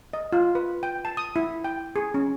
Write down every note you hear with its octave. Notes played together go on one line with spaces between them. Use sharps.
D#5
F4
B4
G5
A5
D#6
E4
G5
G#4
C#4